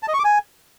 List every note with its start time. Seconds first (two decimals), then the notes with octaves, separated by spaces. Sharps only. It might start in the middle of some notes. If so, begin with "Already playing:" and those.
0.03 A5
0.08 D#5
0.14 C#6
0.19 D6
0.24 G#5